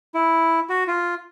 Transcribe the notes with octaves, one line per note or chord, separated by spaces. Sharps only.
E4
F#4
F4